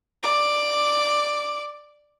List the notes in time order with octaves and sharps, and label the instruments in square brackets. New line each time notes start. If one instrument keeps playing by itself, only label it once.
[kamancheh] D5 D6